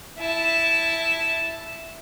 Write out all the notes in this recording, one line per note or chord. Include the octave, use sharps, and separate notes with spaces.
E4 A5